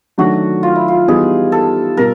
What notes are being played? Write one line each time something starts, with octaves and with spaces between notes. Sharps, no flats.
D#3 F#3 A3 D4 F#4
F4
E4
F4
E3 G3 B3 D#4 G4 G#4
A4
B2 G3 A#4